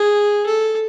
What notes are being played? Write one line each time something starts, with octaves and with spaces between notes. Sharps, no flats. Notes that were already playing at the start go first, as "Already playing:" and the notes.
Already playing: G#4
A4